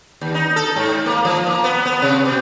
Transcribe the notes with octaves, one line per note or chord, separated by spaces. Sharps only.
D#2
D#4
A4
G#2
A#3
F3
A#3
B3
B3
C3
B2